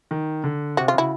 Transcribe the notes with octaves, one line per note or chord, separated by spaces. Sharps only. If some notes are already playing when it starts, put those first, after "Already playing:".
D#3
D3
C3 F#4
F4
C#3 E4 F#4